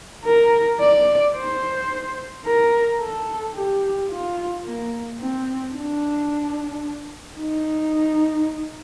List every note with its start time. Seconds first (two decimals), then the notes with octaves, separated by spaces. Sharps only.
0.25 A#4
0.80 D5
1.35 C5
2.45 A#4
3.00 A4
3.54 G4
4.10 F4
4.64 A#3
5.19 C4
5.74 D4
7.39 D#4